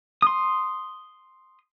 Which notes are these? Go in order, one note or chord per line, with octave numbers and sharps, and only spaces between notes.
C6 D#6